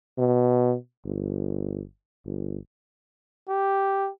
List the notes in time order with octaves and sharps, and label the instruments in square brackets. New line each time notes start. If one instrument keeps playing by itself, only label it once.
[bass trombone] B2
G1
G1
[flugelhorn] G4